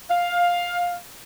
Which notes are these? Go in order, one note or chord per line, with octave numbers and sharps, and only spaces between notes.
F5